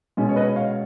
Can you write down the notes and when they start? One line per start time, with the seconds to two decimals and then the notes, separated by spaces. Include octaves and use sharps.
0.17 B2 G#3 C#4
0.29 C#5
0.36 B4 D#5
0.56 C#5 F5